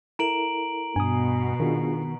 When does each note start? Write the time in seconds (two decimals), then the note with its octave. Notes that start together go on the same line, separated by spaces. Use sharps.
0.19 E4 A4 A#4 A#5 D7 F#7
0.96 G2 B2 G#5 D#6
1.60 D#3 D4 F4 G#4